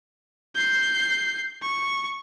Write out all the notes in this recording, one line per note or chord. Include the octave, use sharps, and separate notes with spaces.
G6 C7
C#6